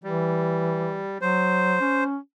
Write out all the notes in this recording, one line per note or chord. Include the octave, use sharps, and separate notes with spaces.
E3 G3
F#3 C5
C#4